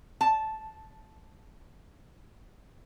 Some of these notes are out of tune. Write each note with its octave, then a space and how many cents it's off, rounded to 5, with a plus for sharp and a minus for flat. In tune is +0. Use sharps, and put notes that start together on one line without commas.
A5 -10